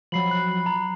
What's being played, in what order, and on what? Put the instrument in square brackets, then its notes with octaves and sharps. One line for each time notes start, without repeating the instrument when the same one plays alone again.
[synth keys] F3 F#3 [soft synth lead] B5 [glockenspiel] C7 F#7
[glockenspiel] F#6
A#5